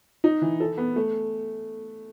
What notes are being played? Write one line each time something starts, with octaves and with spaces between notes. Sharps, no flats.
D#4
E3
A4
B3
A3